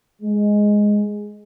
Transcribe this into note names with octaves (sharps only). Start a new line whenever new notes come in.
G#3